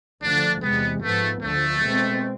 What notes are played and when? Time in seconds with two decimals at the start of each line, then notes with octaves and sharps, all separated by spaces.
0.23 D2 D3 F3 D4
0.63 E2 C3 G#3 B3
1.02 G#2 F3 A3 B3
1.42 D2 D3 F3 A3
1.82 B2 G#3 C4